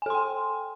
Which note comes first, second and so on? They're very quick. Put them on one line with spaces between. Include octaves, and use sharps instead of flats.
G#5 A4 C6 G5